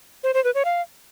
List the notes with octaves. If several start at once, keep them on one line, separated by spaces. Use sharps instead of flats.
C5
C5
B4
C#5
F5